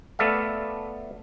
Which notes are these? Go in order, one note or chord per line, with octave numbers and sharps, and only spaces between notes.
A3 B3 A4 D5 E5 F5